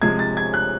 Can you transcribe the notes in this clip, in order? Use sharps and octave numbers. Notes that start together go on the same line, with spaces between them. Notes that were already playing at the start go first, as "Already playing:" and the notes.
C3 F3 G#3 G#6
A6
G#6
F#6